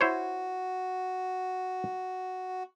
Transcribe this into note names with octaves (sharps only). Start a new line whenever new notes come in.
E4 F#4 C5 C#5